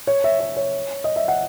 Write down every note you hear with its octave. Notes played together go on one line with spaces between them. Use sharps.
C#5
E5
C#5
C#5
D#5
E5
F#5